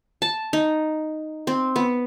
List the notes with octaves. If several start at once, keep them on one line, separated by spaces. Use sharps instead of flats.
A5
D#4
C4
B3